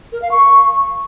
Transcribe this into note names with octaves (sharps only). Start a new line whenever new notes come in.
A#4
F5
C#6